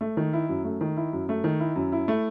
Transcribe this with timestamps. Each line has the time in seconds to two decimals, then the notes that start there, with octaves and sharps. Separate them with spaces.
0.01 A3
0.17 D#3
0.33 E4
0.49 F#2
0.64 A3
0.81 D#3
0.97 E4
1.13 F#2
1.29 A3
1.44 D#3
1.60 E4
1.76 F#2
1.92 E4
2.08 A3